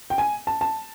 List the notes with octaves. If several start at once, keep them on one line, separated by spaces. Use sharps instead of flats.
G5
G#5
A5
A5